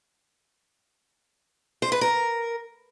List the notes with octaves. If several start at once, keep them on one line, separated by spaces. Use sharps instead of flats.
C5
B4
A#4